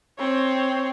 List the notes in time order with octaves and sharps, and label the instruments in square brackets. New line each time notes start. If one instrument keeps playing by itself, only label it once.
[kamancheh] C4 C#5